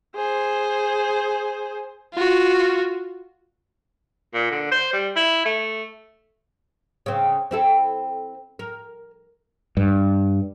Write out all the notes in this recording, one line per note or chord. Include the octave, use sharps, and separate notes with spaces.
G#4 C5
F4 F#4
A#2
D3
C5
G3
E4
A3
C#3 C4
C4 E4 A4
A#4
G2